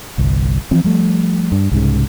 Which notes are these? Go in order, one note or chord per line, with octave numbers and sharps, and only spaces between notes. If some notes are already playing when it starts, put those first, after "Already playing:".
G1 C2
E3 F3 C4
F3 G3 A3
G2
C2 G#2 C#3